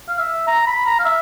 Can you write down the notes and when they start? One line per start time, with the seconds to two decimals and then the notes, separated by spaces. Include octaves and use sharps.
0.08 F5
0.18 E5
0.48 A#5
0.67 B5
0.86 A#5
0.99 F5
1.05 E5